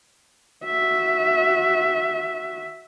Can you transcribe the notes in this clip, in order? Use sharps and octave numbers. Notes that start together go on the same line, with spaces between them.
F#4 E5